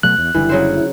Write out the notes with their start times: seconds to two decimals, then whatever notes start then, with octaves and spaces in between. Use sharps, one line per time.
0.03 B2 F#3 A3 F#6
0.18 E2
0.34 F#1 D3 E3 G3 E4
0.49 C#3 F#3 C5